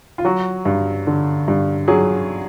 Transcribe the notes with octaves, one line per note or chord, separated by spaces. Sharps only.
F4
F#3 F#4
G2
D3
G2
F#3 G#4